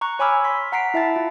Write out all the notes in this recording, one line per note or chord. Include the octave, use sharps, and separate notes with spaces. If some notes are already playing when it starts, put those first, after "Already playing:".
A#5 C#6 F#6
C#5 G#5 B5 D6 E6 F6
C6 B6
F#5 A#5 B6 C7 D7
E4 E5 A5 A6
F4